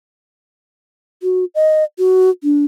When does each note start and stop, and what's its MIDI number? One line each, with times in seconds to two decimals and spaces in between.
1.23 1.45 66
1.55 1.84 75
1.99 2.30 66
2.43 2.65 62